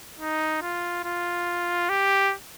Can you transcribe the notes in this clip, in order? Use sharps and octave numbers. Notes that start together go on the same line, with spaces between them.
D#4
F4
F4
G4